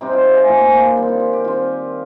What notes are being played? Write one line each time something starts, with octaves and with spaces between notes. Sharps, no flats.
C3 G3 C4 D#4 G4
F4
G4
G#4
A#2 F3 A#3 G#4
G4
G4
G4
D#3 G3 C4 G4
F4
G4
G4
D#3 G3 C4 F4